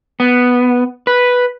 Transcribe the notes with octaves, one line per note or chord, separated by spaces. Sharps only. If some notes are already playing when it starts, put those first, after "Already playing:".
B3
B4